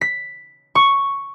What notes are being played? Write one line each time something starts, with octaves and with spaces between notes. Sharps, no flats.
B6
C#6